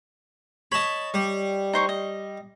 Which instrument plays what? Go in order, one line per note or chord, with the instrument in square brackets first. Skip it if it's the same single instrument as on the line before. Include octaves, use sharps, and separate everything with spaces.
[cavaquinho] C#5 D#5 [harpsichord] A5 B5
[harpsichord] G3
[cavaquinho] D#4 C5 C#6
D#5